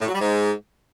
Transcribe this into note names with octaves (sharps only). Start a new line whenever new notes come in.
A2
F#3
G3
G#2